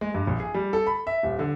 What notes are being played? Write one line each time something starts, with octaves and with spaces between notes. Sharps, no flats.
G#3
G2
A#1
G#4
G3
A4
B5
E5
D#1
D3